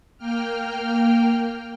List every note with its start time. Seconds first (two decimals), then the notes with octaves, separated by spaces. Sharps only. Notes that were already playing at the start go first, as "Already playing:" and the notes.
0.18 A#3 G5 F6